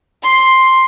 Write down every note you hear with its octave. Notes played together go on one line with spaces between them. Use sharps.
C6